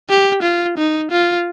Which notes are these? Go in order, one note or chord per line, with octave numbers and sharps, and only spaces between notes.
G4
F4
D#4
F4